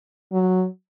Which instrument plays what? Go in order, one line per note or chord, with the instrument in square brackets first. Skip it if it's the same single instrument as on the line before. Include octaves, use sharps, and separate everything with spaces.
[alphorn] F#3